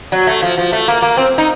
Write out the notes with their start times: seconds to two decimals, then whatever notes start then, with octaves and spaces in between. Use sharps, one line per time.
0.12 F#3
0.27 A3
0.42 F3
0.58 F3
0.73 A3
0.88 A#3
1.02 A#3
1.17 C4
1.38 D#4